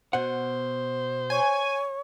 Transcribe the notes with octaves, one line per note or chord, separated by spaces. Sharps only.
B2 C5 F#5
C#5 G#5